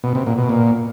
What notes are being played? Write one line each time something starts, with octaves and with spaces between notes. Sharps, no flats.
B2
C3
A#2
B2
A#2